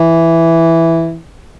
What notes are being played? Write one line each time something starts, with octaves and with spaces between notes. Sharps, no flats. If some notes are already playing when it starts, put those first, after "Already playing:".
Already playing: E3